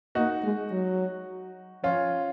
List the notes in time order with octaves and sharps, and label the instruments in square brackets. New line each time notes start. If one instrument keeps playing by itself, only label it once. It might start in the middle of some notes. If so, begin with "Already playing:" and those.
[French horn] A#3 [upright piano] D#4 F#4
[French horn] G#3
F#3
[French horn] F3 [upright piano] C#4 F4